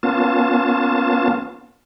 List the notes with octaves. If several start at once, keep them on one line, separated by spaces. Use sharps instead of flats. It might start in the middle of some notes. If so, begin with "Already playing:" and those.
A#3 B3 C#4 F4 A5